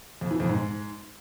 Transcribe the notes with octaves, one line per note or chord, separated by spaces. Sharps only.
F2
E3
F2
G#2